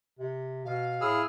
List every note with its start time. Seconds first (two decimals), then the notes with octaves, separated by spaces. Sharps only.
0.19 C3
0.65 B2 F5
1.01 A2 E4 G#4 E6 F6